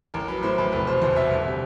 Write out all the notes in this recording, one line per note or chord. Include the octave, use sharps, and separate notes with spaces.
A1 A#4
F#3 B4
A2 C5
A1 B4
F1 B4
B2 C5
E2 C5
B2 E5
G1
C3